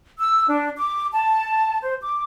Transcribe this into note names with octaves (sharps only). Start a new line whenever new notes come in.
E6
D4
D6
A5
C5
D6